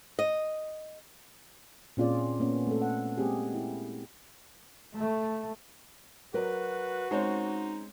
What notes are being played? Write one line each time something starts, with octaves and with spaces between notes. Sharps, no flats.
D#5
A#2 C4 C#4 F4 G#4 D5
A#3 B3 C#4
A3 C4 A4
F#5
G#3 A#3 C4 G4 G#4
E4
A3
F#3 F#4 A#4 B4 D5
G#3 C4 C#4 D#4